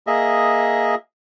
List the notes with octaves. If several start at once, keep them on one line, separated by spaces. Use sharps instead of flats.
A#3 G#4 D#5 E5